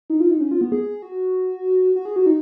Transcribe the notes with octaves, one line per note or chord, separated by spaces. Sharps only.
D#4
F4
D#4
C#4
F4
B3
G#4
F#4
F#4
G#4
F#4
D#4